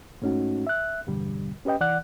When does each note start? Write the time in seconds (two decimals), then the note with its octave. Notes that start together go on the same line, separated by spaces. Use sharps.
0.22 G#2 A3 C#4 D#4 F#4
0.67 E5 F#6
1.07 E2 G2 B2 D3 G3
1.65 C#4 G4 B4 D#5 G5
1.80 C2 E3 D5 F#5 F#6